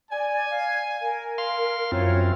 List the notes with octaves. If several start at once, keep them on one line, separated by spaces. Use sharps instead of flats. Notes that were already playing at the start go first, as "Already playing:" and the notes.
D5 G#5
F5
A#4
F5 C6
F#2 E3 F3 C4 F4 A#4 C#5